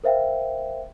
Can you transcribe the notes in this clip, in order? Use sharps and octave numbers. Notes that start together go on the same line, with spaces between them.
A#4 C5 E5 F5 G5